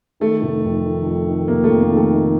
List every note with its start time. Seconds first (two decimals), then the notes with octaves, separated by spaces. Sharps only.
0.20 D#3 A3
0.42 F1
0.64 F2
0.84 D#3
1.06 F2
1.27 D#3
1.48 C3 A#3
1.64 A3
1.69 F2
1.80 A#3
1.91 D#3
1.97 A3
2.13 D#3